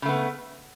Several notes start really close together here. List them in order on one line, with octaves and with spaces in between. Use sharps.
C#3 A3 B3